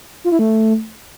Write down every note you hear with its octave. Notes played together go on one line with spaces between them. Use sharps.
F4
E4
A3